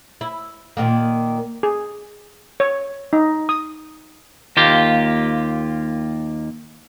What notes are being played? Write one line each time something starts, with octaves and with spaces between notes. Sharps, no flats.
E4
A#2 D#3 A#3
G#4
C#5
D#4
D#6
D#2 A#3 F4 G4